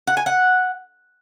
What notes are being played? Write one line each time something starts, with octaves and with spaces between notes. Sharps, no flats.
F#5
G#5
F#5